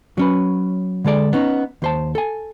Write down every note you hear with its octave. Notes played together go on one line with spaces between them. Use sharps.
F#3 C#4 B4
D3 G#3 A4 D5
B3 C#4 D#4
D#2 C5 A5
A4 G#5